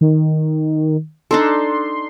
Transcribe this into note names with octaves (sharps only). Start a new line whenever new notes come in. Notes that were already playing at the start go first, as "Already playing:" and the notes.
D#3
D4 D#4 A4 C6